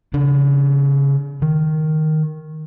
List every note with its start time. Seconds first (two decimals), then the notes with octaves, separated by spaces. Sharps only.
0.14 C#3 D4
1.42 D#3